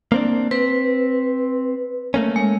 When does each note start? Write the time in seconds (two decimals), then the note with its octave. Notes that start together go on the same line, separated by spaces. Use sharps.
0.12 A#3 C4 D4
0.51 C4 B4
2.14 A3 A#3 C#4
2.36 G#3